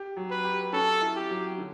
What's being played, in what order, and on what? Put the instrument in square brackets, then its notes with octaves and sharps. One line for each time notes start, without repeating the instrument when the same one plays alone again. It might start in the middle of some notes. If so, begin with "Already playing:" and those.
Already playing: [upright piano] G4
F#3
[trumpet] B4
[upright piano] G4
[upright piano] C#4 [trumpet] A4
[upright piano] E4
[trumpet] G4
[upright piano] F#3
D3